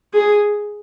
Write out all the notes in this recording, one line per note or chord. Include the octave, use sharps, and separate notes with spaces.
G#4